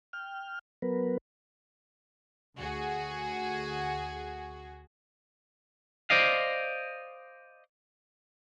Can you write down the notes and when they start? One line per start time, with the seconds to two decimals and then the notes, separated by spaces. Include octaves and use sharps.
0.13 G5 F6
0.82 F#3 B3 A#4 B4
2.56 D2 F#4 G#4
6.10 C5 D5 D#5 F5